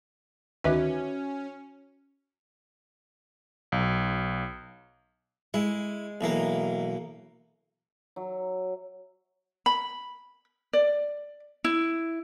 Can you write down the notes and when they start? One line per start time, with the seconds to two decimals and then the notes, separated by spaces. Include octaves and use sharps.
0.64 D2 D#3 C#4 F#4 B4 E5
3.72 B1
5.54 G#3 E4
6.21 B1 E3 A#3
8.16 F#3 E5
9.66 B5
10.73 D5
11.64 E4